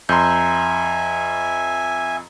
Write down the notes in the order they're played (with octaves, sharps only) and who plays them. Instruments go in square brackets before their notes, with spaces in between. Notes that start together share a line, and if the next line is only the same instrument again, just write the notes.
[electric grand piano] F2 C6 [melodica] E5 G#5 [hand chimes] A#5 G6